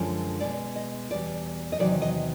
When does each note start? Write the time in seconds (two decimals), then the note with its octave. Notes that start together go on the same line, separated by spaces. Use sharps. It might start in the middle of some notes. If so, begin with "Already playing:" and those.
Already playing: F#2 D3 F3 G#3
0.40 B2 G#3 D5
0.76 D#5
1.11 E2 B2 G3 D5
1.72 D#5
1.79 E2 C3 D#3 F#3 D5
2.02 D#5